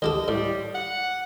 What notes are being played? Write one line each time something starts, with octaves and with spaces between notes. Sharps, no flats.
D2 G4 A4 D#5
A2 G3
F#5